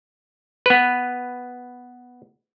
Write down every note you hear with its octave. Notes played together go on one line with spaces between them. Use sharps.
B3 B4